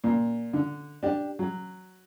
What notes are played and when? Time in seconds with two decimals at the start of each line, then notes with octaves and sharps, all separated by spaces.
0.04 A#2
0.53 D3
1.03 D4 G4
1.39 F#3